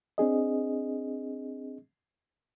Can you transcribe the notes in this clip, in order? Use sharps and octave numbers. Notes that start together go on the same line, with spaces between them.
C4 D4 G#4 D#5